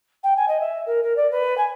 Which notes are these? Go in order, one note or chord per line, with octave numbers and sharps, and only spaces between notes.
G5
G#5
D#5
E5
A#4
A#4
D5
B4
G#5